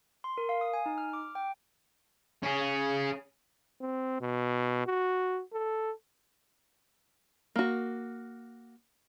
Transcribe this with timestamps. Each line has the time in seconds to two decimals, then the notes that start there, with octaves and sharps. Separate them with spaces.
0.24 C6
0.38 A#4
0.49 F5
0.61 D#6
0.73 G#5
0.86 D#4
0.98 F6
1.13 D6
1.35 G5
2.43 C#4 G#4
3.81 C4
4.21 B2
4.86 F#4
5.53 A4
7.56 A#3 F#4